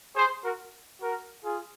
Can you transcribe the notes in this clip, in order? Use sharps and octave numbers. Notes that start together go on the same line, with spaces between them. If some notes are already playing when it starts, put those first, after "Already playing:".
G#4 C5
F#4 A#4
F#4 A#4
F4 G#4